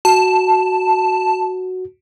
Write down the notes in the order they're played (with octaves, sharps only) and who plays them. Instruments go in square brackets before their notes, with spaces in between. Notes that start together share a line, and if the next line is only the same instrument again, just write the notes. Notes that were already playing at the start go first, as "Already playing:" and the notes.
[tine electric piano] F#4 [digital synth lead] A5